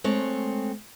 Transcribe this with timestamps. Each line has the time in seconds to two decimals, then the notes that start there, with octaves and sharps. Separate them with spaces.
0.04 G#3 A3 C4 C#5